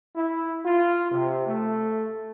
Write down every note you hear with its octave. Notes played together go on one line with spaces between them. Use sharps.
E4
F4
C3
A3